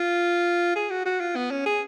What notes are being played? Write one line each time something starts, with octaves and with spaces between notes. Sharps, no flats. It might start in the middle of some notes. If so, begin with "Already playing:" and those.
Already playing: F4
G#4
F#4
F#4
F4
B3
C#4
G#4